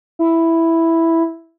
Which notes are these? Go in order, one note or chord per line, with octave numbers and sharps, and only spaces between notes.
E4